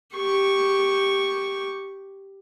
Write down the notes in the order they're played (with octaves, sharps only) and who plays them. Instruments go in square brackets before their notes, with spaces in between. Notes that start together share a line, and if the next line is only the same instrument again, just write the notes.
[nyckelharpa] G4 C#6